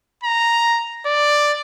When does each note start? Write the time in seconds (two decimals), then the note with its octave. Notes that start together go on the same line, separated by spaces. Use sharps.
0.24 A#5
1.06 D5